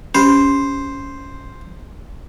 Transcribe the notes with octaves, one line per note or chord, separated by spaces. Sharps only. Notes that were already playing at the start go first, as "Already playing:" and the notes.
C#4 G4 C5